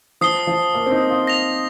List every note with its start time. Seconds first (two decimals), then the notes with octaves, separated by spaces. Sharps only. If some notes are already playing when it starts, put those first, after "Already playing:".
0.21 F3 D#6 C7 G7
0.47 F3
0.75 A#3
0.86 C4
0.91 D#4
1.10 F4
1.27 A#6 F7